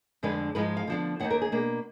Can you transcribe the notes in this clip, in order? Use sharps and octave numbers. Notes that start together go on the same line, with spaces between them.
F2 D3 G#3 D4 B4
G#2 F3 G#3 B4
F5
D3 F3 B3 D4
D#2 D#3 A#3 F#5
A#4
G#4
B2 A#3 D4